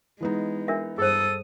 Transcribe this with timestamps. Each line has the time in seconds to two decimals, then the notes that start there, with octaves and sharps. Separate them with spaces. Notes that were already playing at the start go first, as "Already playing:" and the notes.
0.21 E3 G#3 B3 D#4
0.68 D4 A#4 E5
0.98 G2 G#4 A4 C5 D#6